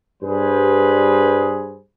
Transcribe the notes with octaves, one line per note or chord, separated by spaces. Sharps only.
G2 G3 G#4 B4 C5